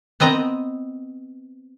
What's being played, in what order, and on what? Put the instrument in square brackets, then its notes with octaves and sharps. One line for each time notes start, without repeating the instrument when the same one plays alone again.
[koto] B3 C4 D#5 A#5